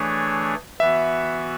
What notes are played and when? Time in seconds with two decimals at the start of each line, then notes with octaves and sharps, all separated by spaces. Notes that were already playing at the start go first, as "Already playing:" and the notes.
Already playing: E3 A3 D4 G#4 C#5
0.80 E3 B3 F#4 E5